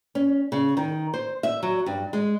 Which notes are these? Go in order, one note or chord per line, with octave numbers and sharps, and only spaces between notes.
C#4
C#3
D#3
C5
E5
F#3
G2
G#3